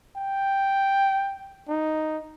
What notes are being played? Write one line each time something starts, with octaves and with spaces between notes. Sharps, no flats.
G5
D#4